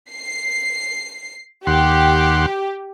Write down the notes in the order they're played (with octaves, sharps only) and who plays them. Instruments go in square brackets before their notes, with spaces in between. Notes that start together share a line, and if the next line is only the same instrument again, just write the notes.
[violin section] C7
[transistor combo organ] D#2 F#5 C6 [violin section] G4